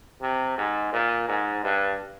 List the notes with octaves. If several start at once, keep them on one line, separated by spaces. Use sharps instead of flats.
C3
G#2
A#2
G#2
G2